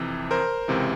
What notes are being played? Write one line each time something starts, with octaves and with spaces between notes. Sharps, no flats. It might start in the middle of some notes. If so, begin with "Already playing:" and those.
Already playing: F2 C3 E3
A#4 C5
C#2 C3 E3